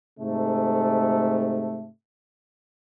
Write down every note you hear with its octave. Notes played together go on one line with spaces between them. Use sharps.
G#2 C3 A3